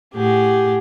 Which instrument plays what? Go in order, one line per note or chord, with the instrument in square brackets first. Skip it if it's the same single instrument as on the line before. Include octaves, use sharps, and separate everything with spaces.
[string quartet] A2 G#4 F#5 [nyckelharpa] G4